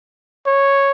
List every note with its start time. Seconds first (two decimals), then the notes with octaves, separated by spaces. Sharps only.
0.46 C#5